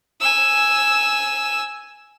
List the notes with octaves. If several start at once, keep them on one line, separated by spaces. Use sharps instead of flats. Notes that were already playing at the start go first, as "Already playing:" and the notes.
G#5 E6